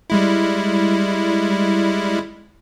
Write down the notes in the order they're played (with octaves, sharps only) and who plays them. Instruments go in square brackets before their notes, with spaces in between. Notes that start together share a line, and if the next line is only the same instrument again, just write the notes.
[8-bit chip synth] G3 G#3 E4